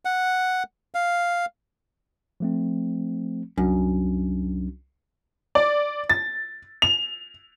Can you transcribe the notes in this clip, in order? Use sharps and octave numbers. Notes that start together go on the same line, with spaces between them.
F#5
F5
F3 A3 C4
C2 F#2 D4
D5
A6
F7